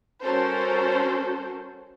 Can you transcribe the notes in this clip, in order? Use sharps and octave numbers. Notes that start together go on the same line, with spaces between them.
G3 C#4 F#4 A4 A#4 C5